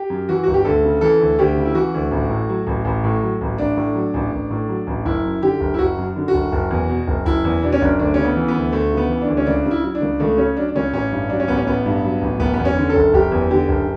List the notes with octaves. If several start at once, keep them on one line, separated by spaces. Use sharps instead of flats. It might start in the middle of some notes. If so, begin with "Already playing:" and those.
Already playing: G4
F#2
E3 F#4
G1 F#4
G4
D2 A4
C#3
E3 A4
D2
D2 G4
C#3
E4
E3 F#4
D2
A1
A2
F#3
A1
A1
A2
F#3
A1
A1 D4
A2
F#3
A1
A1
A2
F#3
A1
F#1 E4
F#2
D3 G4
F#1
E4
F#1 F#4
F#2
D3
F#4
F#1
F#1
E2
B2
F#1
F#1 E4
E2
B2 D4
C#4
F#1 D4
D2 D4
C#3 C#4
B3
E3
B3
D2
D2 A3
C#3
B3
E3
D4
D2
C#4
C#2 D4
C#3
E4
F#3 E4
D4
C#2
C#2 A3
C#3 C#4
F#3 D4
D4
C#2 C#4
A1 C#4
G2
F#3 D4
C#4
A1 B3
C#4
A1 B3
G2
F#3
A1
F#1 B3
B3
E2
C#4
D3
A4
F#1
F#1 G4
E2
D3 G4
F#1